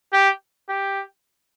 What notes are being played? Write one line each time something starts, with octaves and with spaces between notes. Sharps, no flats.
G4
G4